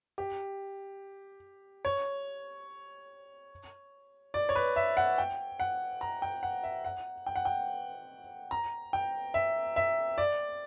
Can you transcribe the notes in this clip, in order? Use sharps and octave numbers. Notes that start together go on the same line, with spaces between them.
G4
C#5
D5
C#5
B4
E5
F#5
G5
F#5
A#5
G5
F#5
E5
F#5
G5
F#5
G5
A#5
G5
E5
E5
D5